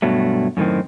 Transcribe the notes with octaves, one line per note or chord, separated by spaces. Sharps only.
G2 B2 F#3 A3
F#2 A2 D#3 C4